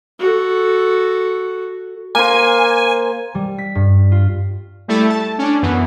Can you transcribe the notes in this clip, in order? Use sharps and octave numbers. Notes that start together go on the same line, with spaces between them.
F#4 A4
A#3 C5 G#5
G3
B6
G2
F4
G3 A3 E4 A4
A5
C#4 D4
F#2 E3 B3